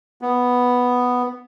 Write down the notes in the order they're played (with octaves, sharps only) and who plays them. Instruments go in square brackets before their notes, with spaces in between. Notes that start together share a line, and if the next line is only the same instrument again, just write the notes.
[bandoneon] B3